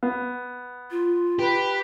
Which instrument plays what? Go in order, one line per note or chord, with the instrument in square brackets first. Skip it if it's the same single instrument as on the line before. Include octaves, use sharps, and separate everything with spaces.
[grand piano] B3
[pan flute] F4
[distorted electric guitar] G4 [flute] B4